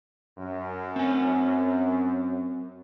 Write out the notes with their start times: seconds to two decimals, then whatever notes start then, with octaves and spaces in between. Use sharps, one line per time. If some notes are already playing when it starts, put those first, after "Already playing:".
0.38 F#2
0.96 C4 G#5